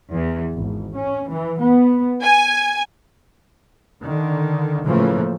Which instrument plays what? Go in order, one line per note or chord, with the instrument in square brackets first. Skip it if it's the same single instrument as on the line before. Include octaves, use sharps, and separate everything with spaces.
[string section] E2
G#1
C#4
E3
B3
G#5
[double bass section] D3 D#3
A2 C#3 E3 F3 A3 A#3